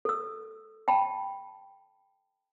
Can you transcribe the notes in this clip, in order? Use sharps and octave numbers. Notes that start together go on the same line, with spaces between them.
A4 E6
G5 A5 B5